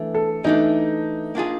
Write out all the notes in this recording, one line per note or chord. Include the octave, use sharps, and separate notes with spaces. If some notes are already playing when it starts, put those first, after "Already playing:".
Already playing: E3 A3 D4
A4
E3 A3 D4 D#4
A#3 D4 F4 G#4